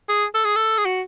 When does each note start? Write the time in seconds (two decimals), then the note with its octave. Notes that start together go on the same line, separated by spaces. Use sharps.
0.09 G#4
0.34 A4
0.44 G#4
0.56 A4
0.78 G#4
0.85 F#4